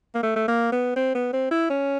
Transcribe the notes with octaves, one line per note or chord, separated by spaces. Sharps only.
A#3
A3
A3
A#3
B3
C4
B3
C4
E4
C#4